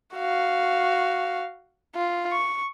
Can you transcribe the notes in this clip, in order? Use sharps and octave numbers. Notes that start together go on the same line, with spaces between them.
F#4 F5
F4
C#6